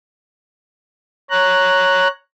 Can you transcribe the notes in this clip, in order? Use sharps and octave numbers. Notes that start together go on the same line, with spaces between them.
C#5 A#5 F#6